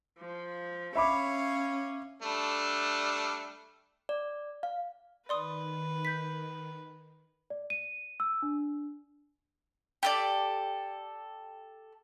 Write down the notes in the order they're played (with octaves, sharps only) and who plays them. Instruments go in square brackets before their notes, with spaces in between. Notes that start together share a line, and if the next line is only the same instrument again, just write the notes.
[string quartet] F3
[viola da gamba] C#4 [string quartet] C#5 F5 [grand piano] E5 B5 D6
[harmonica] G3 A3 D4
[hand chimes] D5
F5
[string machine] D#3 [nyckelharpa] B4 [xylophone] D5 C6 D#6
[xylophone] G6 B6
[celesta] D5
D#7
E6
D4
[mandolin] G4 A4 D5